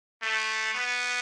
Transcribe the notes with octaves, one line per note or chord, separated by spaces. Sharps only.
A3
B3